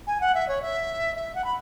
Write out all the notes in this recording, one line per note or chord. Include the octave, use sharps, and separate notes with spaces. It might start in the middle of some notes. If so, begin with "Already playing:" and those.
G#5
F#5
E5
C#5
E5
E5
F#5
B5